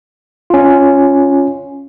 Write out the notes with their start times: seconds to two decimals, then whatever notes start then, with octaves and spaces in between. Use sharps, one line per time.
0.50 C#4 F4